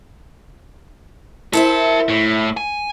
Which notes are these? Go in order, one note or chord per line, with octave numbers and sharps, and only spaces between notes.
E4 A#4 C5 E5 A5
A2
G#5